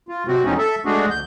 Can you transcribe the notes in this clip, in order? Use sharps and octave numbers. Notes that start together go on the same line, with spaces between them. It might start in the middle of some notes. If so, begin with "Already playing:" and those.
F4
C3 F#3 C4 F#4
E2 A2 F3 C4 C#4 D#4
A4 E5
G#3 A3 D4 F#4 G#4
D2 G6